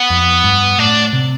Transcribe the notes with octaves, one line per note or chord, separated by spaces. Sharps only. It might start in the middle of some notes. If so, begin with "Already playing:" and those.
Already playing: B3
F2
G2
A2 D4
C3